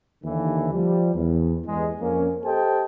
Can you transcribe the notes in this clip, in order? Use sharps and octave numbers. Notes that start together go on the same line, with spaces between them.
D#2 D3 E3
F3 G3
E2
E2 G2 G#3
F2 A#3 C#4
G4 A4 C5 D#5 G5 A5